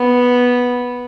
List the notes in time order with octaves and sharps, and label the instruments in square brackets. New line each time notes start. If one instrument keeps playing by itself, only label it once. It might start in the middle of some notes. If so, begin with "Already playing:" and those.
Already playing: [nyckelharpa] B3